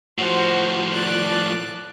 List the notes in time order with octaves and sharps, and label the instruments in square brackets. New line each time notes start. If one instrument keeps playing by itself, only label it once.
[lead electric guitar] A2 F3 [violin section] F#4 C5
[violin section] A4 D5 F#6